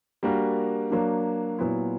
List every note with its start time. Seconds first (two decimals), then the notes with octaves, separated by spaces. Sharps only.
0.23 G3 A#3 D4 F#4 A#4
0.90 F#3 A#3 D4
1.59 A#2 F#3 B3 E4